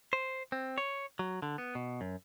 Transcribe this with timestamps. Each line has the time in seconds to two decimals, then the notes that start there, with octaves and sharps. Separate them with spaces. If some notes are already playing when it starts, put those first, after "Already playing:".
0.13 C5
0.52 C4
0.78 C#5
1.19 F#3
1.42 D3
1.58 B3
1.75 B2
2.01 F#2